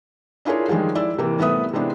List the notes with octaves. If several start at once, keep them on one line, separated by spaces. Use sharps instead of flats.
D4 E4 F4 G#4 A#4 C#5
D#3 F3 G3 G#3 G#4
E4 D5 E6
C3 E3 A#3
C2 A3 B3 B4 E5 D#6
C3 G#3 B3 C4 D4 E4